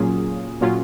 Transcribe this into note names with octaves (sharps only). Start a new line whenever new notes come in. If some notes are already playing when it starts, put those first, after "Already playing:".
Already playing: A#2 F#3 A#3 C#4 F4 G#4
A#2 F#3 A#3 C#4 F4